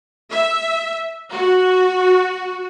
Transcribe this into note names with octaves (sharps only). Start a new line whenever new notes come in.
E5
F#4